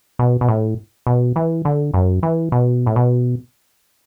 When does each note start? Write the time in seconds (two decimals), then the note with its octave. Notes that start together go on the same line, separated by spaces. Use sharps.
0.19 B2
0.41 B2
0.48 A2
1.07 B2
1.36 E3
1.65 D3
1.94 F#2
2.23 E3
2.52 B2
2.86 A2
2.96 B2